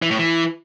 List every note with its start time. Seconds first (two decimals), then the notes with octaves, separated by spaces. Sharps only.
0.02 E3
0.11 A2
0.19 E3